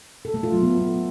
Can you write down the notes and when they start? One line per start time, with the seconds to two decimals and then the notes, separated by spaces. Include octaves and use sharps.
0.25 A4
0.34 A3
0.43 F4
0.52 F#3
0.62 B3